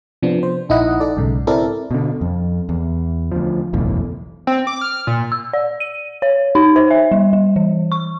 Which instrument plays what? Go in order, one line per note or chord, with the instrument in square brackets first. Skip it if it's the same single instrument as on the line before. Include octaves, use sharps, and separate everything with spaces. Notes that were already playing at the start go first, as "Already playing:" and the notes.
[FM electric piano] C3 F3 B3 D4
C5
A#1 D#4 E4 D#5 F#5
D#4 A4 D5
B1 G#2 C#3
C4 E4 A4 A#4 D5
[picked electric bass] B2 D3
F2
E2
D2 F3
F#1 B1 E2 A2
[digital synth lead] C4
D6
F6
A#2
[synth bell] E6
D5
D#7
C#5
D#4
C5
E5
G3
G3
E3
C#6